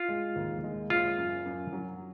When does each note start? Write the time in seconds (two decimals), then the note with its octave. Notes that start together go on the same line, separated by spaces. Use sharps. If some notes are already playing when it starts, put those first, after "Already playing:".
Already playing: F4
0.09 G#3
0.36 D#2
0.64 G#3
0.90 F#1 F4
1.17 F#2
1.46 F#2
1.73 F#3